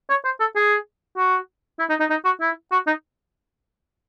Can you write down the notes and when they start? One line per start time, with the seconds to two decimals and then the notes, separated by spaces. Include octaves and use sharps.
0.10 C#5
0.25 C5
0.40 A4
0.56 G#4
1.17 F#4
1.79 E4
1.89 D#4
2.00 D#4
2.10 D#4
2.25 F#4
2.41 E4
2.72 F#4
2.87 D#4